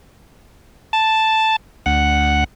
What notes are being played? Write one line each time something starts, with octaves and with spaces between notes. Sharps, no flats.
A5
D2 F#5